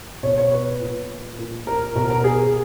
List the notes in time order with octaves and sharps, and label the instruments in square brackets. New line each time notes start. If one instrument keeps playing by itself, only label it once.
[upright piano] B2 C#5
C#5
B4
A#2
A#2
A#4
B2 A#4
A#4
G#4